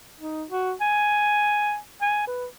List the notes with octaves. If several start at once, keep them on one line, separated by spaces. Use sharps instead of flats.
D#4
F#4
G#5
G#5
B4